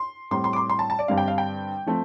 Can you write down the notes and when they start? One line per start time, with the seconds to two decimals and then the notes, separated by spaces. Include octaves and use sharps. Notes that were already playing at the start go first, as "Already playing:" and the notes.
Already playing: C6
0.31 A2 G3 C4 C6
0.44 C6
0.53 D6
0.56 C6
0.70 C6
0.79 A5
0.90 A5
0.99 D5
1.08 G2 D3 G3 C4 F5
1.18 G5
1.28 F5
1.38 G5
1.86 F3 A3 C4